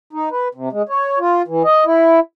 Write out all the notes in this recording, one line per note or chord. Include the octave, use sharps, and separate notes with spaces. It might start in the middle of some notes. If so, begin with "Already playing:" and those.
D#4
B4
C3
G#3
C#5
F4
E3
D#5
E4